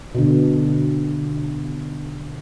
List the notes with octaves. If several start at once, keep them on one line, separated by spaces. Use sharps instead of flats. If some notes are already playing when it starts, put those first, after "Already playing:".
B2 D3